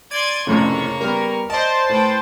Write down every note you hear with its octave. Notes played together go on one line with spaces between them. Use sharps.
D5 C6 G#6 D#7
F1 F2 A2 C#3 A#3 C#6
G3 B3 A#4
C5 D5 D#5 A5
A2 B4 G5